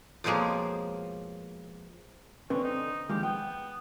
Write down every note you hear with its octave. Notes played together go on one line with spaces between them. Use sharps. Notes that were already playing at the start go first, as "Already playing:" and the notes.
F2 B2 F3 G#3 A#3 C#5
D3 C4 C#4 B4
D#4
D#3 F3 G#3 G4
B3 G5